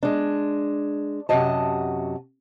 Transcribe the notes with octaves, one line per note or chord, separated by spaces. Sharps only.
G#3 D4
F#2 C3 F#4 D#5 A5